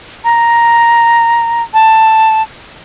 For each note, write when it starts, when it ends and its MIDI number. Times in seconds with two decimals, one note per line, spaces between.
0.24 1.63 82
1.74 2.42 81